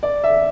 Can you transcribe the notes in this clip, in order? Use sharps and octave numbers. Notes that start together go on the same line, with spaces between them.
D5
E5